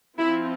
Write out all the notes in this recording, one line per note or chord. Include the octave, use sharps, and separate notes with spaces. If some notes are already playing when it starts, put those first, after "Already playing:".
F3 C4 E4